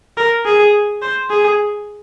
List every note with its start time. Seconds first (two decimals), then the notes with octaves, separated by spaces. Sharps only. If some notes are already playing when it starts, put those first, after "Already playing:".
0.17 A#4
0.45 G#4
1.02 C5
1.30 G#4